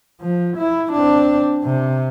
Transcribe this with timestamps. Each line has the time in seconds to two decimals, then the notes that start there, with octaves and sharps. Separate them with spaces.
0.21 F3
0.57 E4
0.93 C4 D4
1.64 C3